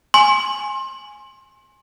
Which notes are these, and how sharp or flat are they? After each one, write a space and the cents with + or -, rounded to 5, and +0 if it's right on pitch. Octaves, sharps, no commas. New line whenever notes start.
G#5 +0 C6 +30